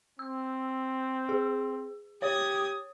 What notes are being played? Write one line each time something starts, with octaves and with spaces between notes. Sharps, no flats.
C4 E6
G#4
G4 C#5 D#6 G#6